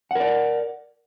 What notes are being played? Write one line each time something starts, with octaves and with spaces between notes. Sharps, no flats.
A#4 D5 F#5